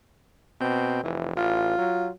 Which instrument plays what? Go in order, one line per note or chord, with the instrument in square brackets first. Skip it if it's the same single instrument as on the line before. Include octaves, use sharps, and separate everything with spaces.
[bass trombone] B2 [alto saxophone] C4
[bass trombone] F1 [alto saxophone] E3
[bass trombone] A1 [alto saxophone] F4
[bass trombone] F#3